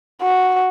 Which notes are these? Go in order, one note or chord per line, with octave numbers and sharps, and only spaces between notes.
F#4